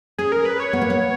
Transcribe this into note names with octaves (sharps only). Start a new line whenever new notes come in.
C#4 G#4
A#4
B4
C#5
B3
A#3
B3